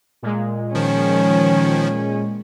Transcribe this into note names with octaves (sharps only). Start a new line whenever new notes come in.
A#2 G#3
D#3 F3 C#4